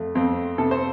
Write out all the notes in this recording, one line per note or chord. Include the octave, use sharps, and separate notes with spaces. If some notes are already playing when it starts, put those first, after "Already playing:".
Already playing: F2 A3
F2 C4
C3 A4
C5